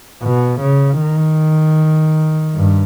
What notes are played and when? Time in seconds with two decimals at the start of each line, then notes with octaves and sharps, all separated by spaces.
0.23 B2
0.62 C#3
1.01 D#3
2.55 G2